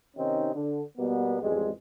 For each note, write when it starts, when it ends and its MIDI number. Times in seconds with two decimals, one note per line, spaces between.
0.17 0.50 48
0.17 0.50 51
0.17 0.50 60
0.17 0.50 61
0.17 0.50 63
0.54 0.82 50
0.98 1.39 47
0.98 1.39 55
0.98 1.39 58
0.98 1.39 59
1.42 1.70 33
1.42 1.70 41
1.42 1.70 55
1.42 1.70 56